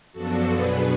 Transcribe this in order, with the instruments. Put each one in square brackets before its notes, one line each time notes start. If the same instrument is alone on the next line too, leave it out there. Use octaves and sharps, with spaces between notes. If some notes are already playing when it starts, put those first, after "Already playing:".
[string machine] F#2 F3 B3 D4 F#4 A4
B2 F#3 B3 D4 G#4 B4